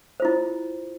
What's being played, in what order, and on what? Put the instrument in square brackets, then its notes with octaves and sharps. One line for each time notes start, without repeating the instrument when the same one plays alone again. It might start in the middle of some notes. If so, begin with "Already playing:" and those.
[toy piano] C5
F4
E4